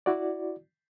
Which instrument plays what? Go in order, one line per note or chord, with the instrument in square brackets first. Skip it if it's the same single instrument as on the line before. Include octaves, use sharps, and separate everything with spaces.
[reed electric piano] E4 F#4 D5